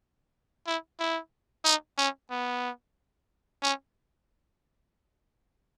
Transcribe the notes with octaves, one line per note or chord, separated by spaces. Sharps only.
E4
E4
D#4
C#4
B3
C#4